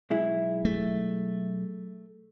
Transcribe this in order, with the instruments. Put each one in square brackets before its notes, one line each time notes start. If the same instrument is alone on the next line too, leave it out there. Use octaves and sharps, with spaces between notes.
[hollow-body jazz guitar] B1 G#3 E4
[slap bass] A3